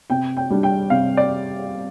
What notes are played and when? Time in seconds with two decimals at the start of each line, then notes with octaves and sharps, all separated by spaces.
0.10 C3 G5
0.37 G5
0.50 G3 D4
0.63 G5
0.90 C3 F5
1.17 D5